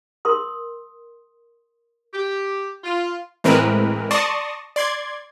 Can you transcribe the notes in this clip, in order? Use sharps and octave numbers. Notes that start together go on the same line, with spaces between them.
A#4 C6 D#6
G4
F4
A2 E3 G#3 C4 A#4 B4
D5 A5 C6 C#6 D#6 A#6
D5 C6 G#6